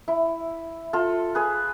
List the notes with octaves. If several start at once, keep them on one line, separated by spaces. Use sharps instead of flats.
E4
F4 A4
G#4 B4